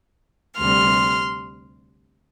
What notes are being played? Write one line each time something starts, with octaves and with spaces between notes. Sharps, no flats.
D2 C3 G3 C6 F6